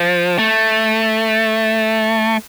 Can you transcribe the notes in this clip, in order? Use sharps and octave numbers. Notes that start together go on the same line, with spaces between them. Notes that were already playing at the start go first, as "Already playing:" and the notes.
Already playing: F3
A3